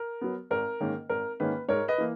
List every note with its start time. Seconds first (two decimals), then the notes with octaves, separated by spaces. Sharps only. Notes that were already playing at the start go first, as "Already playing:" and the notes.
Already playing: A#4
0.21 F#3 B3
0.51 G#1 A#4
0.81 G#2 D#3 A#3 C#4
1.09 G#1 A#4
1.40 G#2 D#3 A#3 C#4 B4
1.69 G#2 A#4 C#5
1.88 B4 D#5
1.98 E3 A#3